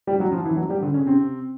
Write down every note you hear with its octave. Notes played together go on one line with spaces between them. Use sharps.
G3 G4
F#3 F#4
F3 F4
E3 E4
F#3 F#4
G3 G4
D3 D4
C#3 C#4
C3 C4